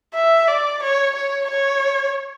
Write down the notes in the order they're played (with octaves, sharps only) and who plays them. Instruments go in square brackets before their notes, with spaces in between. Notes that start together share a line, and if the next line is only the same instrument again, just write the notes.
[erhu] E5
D5
C#5
C#5
C#5